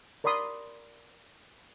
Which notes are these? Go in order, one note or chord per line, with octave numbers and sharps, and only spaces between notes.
A#4 D5 B5 C6 D#6